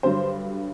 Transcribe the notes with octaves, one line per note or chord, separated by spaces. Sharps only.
G2 D3 F#3 C5